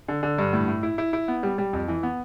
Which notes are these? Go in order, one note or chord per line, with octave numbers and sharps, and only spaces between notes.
D3
D3
G2
A2
A2
E4
E4
E4
B3
G3
G3
F2
E3
B3